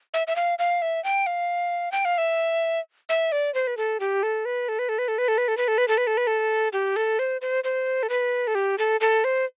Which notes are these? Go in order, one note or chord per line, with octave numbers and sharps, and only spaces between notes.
E5
E5
F5
F5
E5
G5
F5
G5
F5
E5
E5
D5
C5
B4
A4
G4
A4
B4
A4
B4
A4
B4
A4
B4
A4
B4
A4
B4
A4
B4
A4
B4
A4
B4
A4
G4
A4
C5
C5
C5
A4
B4
A4
G4
A4
A4
C5